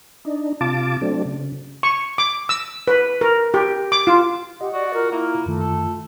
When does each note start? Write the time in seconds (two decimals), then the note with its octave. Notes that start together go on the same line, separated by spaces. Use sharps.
0.25 D4 D#4
0.61 C3 F4 A5 D6
1.01 F#3 A3 C4 D4
1.25 C#3
1.83 C#6
2.18 D6
2.49 E6
2.88 B4
3.21 A#4
3.54 G4
3.92 D6
4.07 F4
4.61 G4 D#5 F#5
4.73 F#4 D5
4.94 F4 A#4
5.12 A#3 E4 A#4 E5 F6
5.46 F#2 D#3 A3
5.60 A4